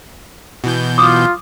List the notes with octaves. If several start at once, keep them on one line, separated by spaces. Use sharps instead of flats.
B2 E3 G6
F4 D6 D#6